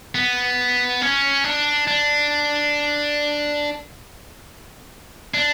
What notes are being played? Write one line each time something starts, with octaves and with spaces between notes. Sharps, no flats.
B3
C#4
D4
D4
D4